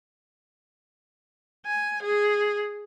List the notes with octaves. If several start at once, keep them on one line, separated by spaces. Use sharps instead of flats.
G#5
G#4